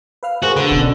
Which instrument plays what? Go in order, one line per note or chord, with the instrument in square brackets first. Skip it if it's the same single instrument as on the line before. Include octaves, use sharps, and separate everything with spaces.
[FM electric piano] B4 F5 F6
[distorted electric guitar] F#4 [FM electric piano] G#4 A#4 C5
[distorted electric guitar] D3 [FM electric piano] B4
[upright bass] B2 [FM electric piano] C#4